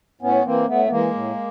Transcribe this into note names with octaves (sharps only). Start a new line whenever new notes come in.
A2 B3 C#4
E3 A#3 C4
A2 A3 B3
B3
E3 G#3 A#3
A2